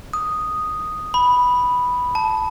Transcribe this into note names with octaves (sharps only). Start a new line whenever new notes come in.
D#6
B5
A5